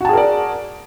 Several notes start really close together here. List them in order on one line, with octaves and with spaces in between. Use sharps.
F#4 A5 G#4 A#4 D5